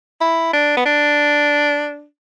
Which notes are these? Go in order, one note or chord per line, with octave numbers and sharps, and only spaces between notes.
E4
D4
B3
D4